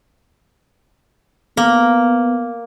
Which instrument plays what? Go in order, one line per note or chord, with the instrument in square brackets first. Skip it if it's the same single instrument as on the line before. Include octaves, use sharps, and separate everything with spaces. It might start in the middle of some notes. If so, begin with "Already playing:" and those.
[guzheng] A#3 [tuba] B3